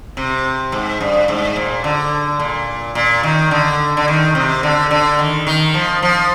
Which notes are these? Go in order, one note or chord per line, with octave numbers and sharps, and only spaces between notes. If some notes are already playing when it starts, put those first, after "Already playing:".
C3
G#2
G2
G#2
A#2
D3
A#2
A#2
D#3
D3
D3
D#3
C3
D3
D3
D#3
D#3
F3
F3